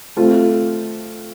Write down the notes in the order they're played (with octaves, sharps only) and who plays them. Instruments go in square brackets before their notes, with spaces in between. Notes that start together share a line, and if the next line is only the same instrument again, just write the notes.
[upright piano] A3 C4 F4